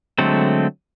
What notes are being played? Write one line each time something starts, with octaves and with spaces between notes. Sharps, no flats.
D3 F#3 G#3 A3 C4